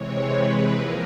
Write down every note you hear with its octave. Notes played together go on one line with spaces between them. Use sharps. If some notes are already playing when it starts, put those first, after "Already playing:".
Already playing: C3 E3 G#3 C4 C#5
B4
F3 A#3 A#4